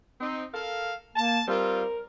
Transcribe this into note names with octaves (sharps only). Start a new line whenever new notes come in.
C4 D#4
A4 A#4 F5
A#3 A5
G3 C4 F4 A#4